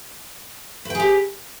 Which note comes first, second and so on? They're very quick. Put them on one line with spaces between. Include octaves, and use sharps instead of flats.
B4 G5 G#4 G4